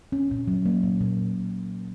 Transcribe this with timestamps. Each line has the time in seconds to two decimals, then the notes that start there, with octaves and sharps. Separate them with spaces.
0.12 C#4
0.31 A#2
0.48 F#3
0.66 A#3
0.83 A#2
1.01 A#2